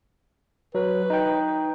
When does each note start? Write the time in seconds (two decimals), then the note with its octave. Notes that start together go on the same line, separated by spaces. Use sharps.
0.75 F#3 B4
1.10 D#4 G5